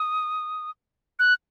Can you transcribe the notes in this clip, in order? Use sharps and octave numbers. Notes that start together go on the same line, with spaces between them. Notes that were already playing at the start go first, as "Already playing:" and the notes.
Already playing: D#6
F#6